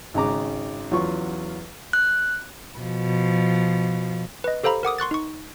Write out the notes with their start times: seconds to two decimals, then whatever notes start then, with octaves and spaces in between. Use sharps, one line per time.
0.14 G#1 C#3 A#5 D6
0.91 E2 F#3 C#4 F4 C#6
1.93 F#6
2.79 B2 F3
4.44 B4 D#5
4.63 G4 A4 C5 F5 A#5 B5
4.83 A#4 F#5 D6 D#6
4.99 C6 C#6 F#6 A6
5.11 D#4 C#6